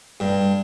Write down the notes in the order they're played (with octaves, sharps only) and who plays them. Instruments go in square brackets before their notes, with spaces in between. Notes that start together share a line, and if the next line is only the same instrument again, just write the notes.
[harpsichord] G2